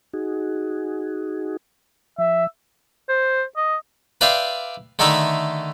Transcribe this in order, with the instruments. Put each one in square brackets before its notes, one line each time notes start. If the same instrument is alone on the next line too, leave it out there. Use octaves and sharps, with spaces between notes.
[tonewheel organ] D#4 F#4 G#4
[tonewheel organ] F3 [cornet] E5
[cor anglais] C5
D#5
[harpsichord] B4 D5 E5 F5 G5 C6
D3 D#3 A3 D#4 E5 B5